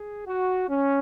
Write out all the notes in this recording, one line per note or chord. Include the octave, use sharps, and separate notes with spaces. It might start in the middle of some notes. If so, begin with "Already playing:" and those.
Already playing: G#4
F#4
C#4